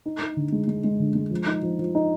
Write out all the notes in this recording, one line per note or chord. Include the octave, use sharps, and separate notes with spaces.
D#4
D#4
D3
G#3
G#3
G#3
D3
G#3
F3
D#4
F3
F3
D#4